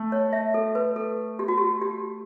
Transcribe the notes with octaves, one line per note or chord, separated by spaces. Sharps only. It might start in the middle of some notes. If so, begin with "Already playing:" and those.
Already playing: A3
C#5
E5
A4
B4
A4
G4
F#4
G4
G4